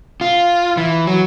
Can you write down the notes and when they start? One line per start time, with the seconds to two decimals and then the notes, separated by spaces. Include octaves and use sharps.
0.21 F4
0.77 E3
1.07 F#3